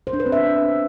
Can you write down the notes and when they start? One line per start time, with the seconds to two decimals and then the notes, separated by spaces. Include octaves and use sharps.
0.07 C5
0.13 D4
0.20 B4
0.26 C4
0.32 E5